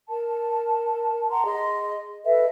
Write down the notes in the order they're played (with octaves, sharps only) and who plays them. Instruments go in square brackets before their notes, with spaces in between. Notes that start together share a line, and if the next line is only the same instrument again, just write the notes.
[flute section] A#4 A5
F#5 A#5 C6
G#4 D#5 C6
A4 B4 D#5 E5